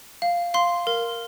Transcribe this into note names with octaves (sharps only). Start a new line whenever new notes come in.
F5
F5 C6
A#4